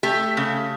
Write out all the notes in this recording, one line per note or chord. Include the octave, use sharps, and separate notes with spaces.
A3 G4
C#3